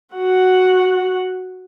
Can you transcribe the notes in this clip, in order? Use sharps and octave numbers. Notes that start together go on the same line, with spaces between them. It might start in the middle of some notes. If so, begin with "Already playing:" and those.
F#4 F#5